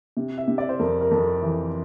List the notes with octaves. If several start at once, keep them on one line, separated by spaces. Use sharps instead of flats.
C3
E5
C3
D5
C5
F2 A#4
A#4
F2
A4
E3